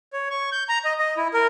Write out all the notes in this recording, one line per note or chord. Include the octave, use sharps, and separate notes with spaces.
C#5
C#6
G6
A#5
D#5
D#5
E4
A#4